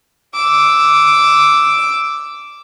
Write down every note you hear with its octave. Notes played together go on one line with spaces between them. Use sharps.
D6 E6